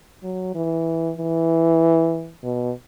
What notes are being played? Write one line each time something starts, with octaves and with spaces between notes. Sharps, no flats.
F#3
E3
E3
B2